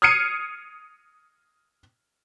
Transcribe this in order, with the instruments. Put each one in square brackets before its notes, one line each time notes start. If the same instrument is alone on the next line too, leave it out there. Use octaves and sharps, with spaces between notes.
[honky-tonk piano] D#6 F6 G#6 C7 C#7 D#7